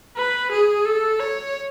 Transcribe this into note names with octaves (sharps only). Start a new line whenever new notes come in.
B4
G#4
A4
C#5